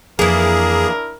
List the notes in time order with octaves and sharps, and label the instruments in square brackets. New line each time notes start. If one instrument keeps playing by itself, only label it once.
[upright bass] F2 [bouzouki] E3 A#3 [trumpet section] D4 E4 A#4 [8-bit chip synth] G#4